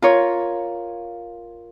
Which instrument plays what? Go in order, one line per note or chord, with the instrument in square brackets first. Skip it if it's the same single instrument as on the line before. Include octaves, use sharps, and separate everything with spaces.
[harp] F4 A#4 C#5